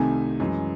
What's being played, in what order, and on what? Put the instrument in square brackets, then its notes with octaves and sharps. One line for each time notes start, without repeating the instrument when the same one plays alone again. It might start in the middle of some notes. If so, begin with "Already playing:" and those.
Already playing: [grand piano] C2 C3 D#3 A3 G#5
F#2 E3 G#3